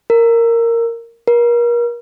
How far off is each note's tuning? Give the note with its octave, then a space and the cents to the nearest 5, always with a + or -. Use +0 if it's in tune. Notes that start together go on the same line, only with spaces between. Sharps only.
A#4 -10
A#4 +35